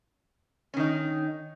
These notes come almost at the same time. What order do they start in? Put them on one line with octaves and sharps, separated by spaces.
C#4 D#3 D#4